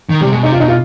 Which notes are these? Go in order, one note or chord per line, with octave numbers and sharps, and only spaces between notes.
D#3
C3 G3
B2 G#3
C3 D#4
F4
B2 D#4
F4